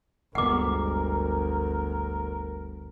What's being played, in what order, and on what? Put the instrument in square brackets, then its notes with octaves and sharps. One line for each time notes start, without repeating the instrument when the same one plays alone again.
[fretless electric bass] G1 G#3 B3 [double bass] D2 [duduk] A#4 [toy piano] F#5 D6